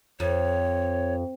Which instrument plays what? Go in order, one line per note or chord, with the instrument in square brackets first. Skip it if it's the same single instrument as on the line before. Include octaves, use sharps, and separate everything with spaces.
[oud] F2 [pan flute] C#5